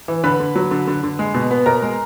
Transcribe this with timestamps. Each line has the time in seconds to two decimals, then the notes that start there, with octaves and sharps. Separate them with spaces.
0.08 E3
0.24 D3 B4 B5
0.40 D3
0.56 F#3
0.71 D3
0.87 D3
1.03 D3
1.19 G#3
1.34 B2
1.51 B3
1.66 B2 A#4 A#5
1.82 G#3